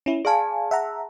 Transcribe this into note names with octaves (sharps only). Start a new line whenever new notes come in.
C#4 E4
G#4 D5 F5 G#5 A5
E5 F#5 A#5